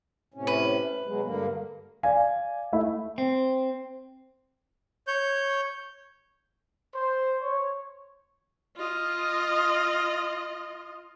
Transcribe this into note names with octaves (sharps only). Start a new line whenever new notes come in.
A2 C3 C#4
B4
B2 F#3 G#3
G2 D3 A#3
D5 F5 G#5
A3 E4 E5
C4
C#5 G6
C5
C#5
F4 D#5